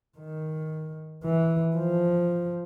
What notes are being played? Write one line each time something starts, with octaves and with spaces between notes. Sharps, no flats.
D#3
E3
F3